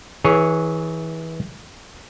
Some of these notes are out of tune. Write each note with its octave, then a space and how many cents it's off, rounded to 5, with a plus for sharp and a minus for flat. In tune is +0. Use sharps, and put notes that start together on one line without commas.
E3 -25 G#4 +0 C#5 +0